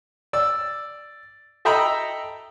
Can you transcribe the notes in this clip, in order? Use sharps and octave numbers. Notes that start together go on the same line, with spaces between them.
D5 E6
A4 D#5 E5 G5 A#5 B5